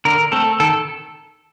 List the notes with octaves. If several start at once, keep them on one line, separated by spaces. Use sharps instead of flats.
D3 A#4
A3 C4 A4
D#3 A4